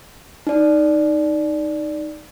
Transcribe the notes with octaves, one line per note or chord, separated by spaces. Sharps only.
D#4 D5